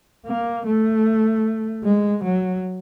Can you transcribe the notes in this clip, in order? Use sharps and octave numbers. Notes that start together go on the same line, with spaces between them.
A#3
A3
G#3
F#3